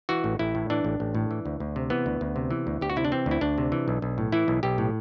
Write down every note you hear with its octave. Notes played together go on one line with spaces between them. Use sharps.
E3 F#4
A1
A1 E4
A2
E3 D4
A1
A1
A2
E3
D2
D2
C3
E3 B3
D2
D2
C3
E3
D2
D2 G4
F#4
C3 E4
D4
E3 C4
D2
E4
D2 D4
C3
E3
B1
B1
A2
E3 E4
B1
B1 G4
A2